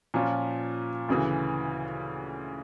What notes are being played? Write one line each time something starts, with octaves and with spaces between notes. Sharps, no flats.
A#2 F3 C#4 F4
D2 C#3 E3